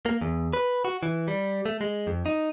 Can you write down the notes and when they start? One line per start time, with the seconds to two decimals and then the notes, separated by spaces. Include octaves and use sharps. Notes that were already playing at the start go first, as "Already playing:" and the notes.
0.06 A#3
0.21 E2
0.53 B4
0.85 F#4
1.03 E3
1.28 G3
1.66 A3
1.81 G#3
2.07 F2
2.26 D#4